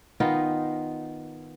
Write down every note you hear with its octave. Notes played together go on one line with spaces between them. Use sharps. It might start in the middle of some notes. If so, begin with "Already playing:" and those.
D#3 B3 D#4 F4